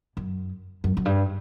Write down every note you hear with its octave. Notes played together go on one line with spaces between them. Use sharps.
F#2
F#2
F#2
G2